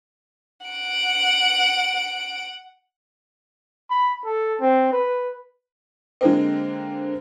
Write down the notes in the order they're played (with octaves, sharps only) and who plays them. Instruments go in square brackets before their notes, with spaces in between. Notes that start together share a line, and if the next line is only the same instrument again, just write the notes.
[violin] F#5 D7
[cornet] B5
A4
C4
B4
[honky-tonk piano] D3 G#3 A#3 C4